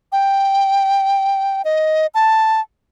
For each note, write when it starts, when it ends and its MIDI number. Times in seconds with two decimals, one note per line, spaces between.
0.12 1.62 79
1.65 2.07 75
2.15 2.61 81